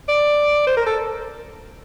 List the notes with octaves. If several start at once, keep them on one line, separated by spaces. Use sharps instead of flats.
D5
C5
A#4
A4